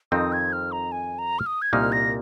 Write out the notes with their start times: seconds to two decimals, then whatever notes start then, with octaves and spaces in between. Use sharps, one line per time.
0.12 F2 D#3 C4 D#4 D#6
0.33 G#6
0.53 F6
0.72 A#5
0.92 G#5
1.19 A#5
1.39 F6
1.46 D#6
1.62 G#6
1.73 C2 A#2 A#3 D#4 F6
1.92 A#6